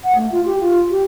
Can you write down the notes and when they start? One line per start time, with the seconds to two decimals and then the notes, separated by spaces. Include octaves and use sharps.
0.04 F#5
0.15 A3
0.32 F4
0.46 G4
0.60 F4
0.90 G4